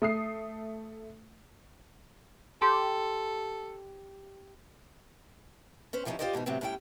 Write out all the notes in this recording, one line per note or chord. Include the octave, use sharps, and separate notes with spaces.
A3 D#6 C7
G4 A4 C6
C#4 B4 C5
C3 F3 G3 C#4 D#4 E4
F4 G4 G#4 C5 D5 D#5
G#2 B2 E3 D#4
A2 C3 F#3 B3 C4
A2 G3 C#4 E4 A4 G5